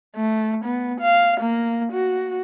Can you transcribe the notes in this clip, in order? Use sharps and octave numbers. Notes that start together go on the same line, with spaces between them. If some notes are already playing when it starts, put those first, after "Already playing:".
A3
B3
F5
A#3
F#4